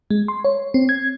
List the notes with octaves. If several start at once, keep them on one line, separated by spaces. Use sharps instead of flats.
G#3
C6
C#5
C4
G#6